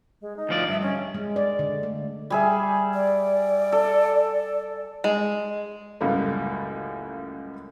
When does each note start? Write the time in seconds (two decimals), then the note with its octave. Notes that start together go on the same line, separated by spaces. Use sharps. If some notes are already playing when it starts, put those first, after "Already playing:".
0.21 G#3
0.37 D#4
0.49 D2 F3 D5
0.68 G2 E5
0.82 C#4
1.14 G#3
1.36 D5
1.59 D3
1.83 A3
2.30 G3 G#4 E5
2.94 D5
3.72 A4
5.04 G#3
6.01 C#2 F#2 A2 G3 A3 A#3